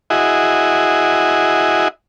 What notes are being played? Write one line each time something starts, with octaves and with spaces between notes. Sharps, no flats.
E4 F#4 G#4 D#5